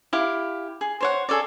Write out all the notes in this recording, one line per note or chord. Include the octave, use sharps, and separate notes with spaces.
E4 G4 F5
G#4
C5 C#5 F#5
G#4 A4 C#5 D5